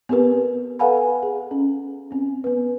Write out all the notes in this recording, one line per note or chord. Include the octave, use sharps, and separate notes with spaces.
B3 C4 G4 A#4 B4
A4 B4 F5 F#5 G#5 B5
G#4
C#4
C4 C#4
B3 B4